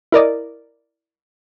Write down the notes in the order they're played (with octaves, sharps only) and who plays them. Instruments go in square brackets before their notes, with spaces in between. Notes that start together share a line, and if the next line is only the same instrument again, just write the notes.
[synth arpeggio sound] E4 A#4 D5 D#5